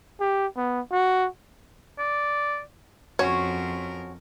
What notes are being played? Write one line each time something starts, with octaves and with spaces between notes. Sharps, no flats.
G4
B3
F#4
D5
F2 C#4 F#4 A#4 C#5